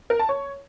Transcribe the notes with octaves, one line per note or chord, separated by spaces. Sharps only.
A#4
A5
C#5